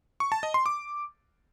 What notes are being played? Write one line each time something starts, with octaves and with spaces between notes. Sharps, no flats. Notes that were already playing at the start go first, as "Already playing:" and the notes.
C#6
A5
D#5
C6
D6